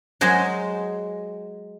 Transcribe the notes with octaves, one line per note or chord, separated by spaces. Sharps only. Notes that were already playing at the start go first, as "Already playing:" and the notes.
F#3 G#3 C5 D#5 G#5